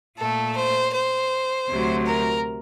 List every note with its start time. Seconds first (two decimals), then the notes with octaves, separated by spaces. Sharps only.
0.18 A#2 A3 A4
0.56 C5
0.94 C5
1.69 D2 C3 F#3
2.06 A#4